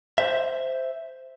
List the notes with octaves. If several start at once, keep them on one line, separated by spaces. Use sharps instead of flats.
C5 E5